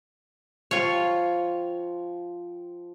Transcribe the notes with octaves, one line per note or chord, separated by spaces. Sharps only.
F3 F4 C#5 G5